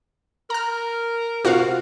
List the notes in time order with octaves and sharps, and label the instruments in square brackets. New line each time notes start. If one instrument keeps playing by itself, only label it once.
[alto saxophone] A#4 [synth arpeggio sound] A#5 F6
[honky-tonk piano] C3 F4 C5 [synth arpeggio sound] F#4 F5